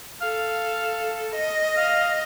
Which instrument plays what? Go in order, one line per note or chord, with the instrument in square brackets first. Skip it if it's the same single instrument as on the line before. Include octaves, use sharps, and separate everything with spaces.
[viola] A4 [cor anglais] F5
[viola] D#5
[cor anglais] F5